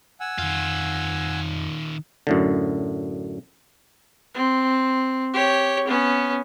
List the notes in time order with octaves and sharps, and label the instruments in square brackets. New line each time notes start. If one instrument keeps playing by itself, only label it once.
[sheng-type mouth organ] F#5 G#5 E6
[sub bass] F2 [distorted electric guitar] D#3 F4
[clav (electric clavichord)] F#2 A2 D3
[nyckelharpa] C4
G4 C#5
B3 C#4